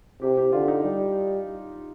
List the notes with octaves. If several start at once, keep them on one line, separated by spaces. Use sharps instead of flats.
C3 G4
G4
D3 F4
D#4
G3